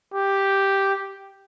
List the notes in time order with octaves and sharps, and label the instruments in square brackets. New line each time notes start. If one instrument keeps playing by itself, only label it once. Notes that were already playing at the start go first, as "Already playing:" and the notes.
[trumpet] G4